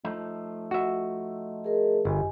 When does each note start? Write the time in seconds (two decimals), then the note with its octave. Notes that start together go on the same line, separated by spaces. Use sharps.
0.05 F3 A3 D#4
0.71 F#4 D#5 E5
1.64 G#4 A#4 D#5
2.05 G1 G4 D#5 G#5